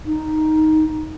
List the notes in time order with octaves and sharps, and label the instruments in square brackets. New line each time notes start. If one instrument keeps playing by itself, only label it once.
[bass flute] D#4